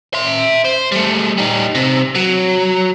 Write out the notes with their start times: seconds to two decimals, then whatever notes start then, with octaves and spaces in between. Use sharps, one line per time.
0.14 E5 C6
0.65 C5
0.92 G3 A3
1.38 G3 D#4
1.75 C3
2.15 F#3